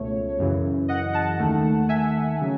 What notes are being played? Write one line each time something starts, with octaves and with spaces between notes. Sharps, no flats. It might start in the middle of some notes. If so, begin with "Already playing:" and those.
Already playing: C#2 B2 A3 C#5
F#2 C#3 E3
D#5 F#5
F#5 A5
D#2 D#3 A3
E5 G#5
C#3 F#3